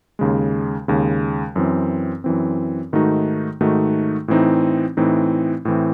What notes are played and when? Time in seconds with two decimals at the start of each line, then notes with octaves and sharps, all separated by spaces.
0.19 D#2 C#3 G#3
0.88 D#2 C#3 G#3
1.56 F#2 E3 C4
2.24 F#2 E3 C4
2.93 G#2 D#3 A3 D#4 F#4
3.61 G#2 D#3 A3 D#4 F#4
4.28 A2 E3 C4 D#4
4.97 A2 E3 C4 D#4
5.65 A2 E3 C4